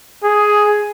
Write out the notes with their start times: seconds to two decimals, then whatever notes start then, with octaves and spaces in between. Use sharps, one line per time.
0.24 G#4